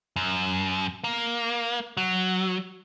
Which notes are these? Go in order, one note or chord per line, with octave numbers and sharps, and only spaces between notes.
F#2
A#3
F#3